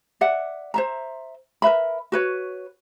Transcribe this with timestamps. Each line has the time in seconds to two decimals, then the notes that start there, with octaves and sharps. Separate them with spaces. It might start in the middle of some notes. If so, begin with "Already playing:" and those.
0.21 D5 E5 F#5
0.74 C5 E5 A#5
1.62 A#4 B4 E5 B5
2.12 F#4 B4 C#5